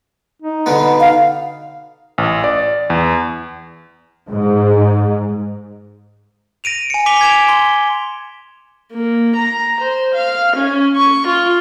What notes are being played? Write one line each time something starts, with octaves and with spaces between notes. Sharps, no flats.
D#4
B2 D3 B3
F5
A1
D5
E2
G#2
A#6 D7 D#7 F7
G#5 C#7
D6 B6 D7 D#7 F7 G7
G#6 B6 D7 E7 F7
C6 G7
A#3
A#5
C5
F5
C#4
C#6
F4